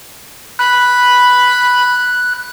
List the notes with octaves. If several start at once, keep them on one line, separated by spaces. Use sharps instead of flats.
B5 F#6